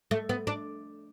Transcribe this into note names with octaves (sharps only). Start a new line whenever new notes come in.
A3
B3
D4